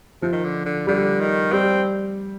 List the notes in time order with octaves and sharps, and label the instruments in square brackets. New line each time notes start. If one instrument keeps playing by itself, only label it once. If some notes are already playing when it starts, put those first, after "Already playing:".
[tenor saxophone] C3 [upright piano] F3
[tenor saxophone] D#3
D3
D3
[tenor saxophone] D3 [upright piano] G3
[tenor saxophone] D#3
[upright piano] G3 [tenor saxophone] C4